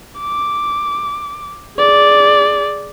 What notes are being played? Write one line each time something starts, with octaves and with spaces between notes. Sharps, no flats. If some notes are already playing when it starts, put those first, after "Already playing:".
D6
G#4 D5